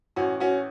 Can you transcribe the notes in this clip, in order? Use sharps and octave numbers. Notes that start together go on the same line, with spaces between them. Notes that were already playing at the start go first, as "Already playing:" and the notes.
A1 C#4 F#4
C#4 F#4